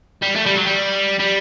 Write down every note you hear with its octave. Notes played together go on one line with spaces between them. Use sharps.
G3
A3
G3
F#3
G3
G3